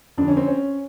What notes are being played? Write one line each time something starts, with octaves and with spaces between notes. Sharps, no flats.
F2 D3 D4
C#4
C4
C#4